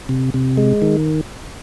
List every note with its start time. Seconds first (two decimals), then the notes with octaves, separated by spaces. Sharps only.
0.09 C3
0.34 C3
0.57 G#3
0.82 D#3